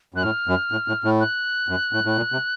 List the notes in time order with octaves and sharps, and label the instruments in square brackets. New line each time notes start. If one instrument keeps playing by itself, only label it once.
[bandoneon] F#2 [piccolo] F#6
[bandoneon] A2 [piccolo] F6
[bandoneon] F#2
A2
A2
A2
[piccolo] F#6
[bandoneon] F#2
A2
A2
A#2
C3